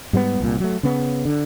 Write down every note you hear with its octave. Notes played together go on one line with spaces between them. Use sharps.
G#2 G3 A#3 B3
C2 A#2
F#3 A3
C#3 B3
D3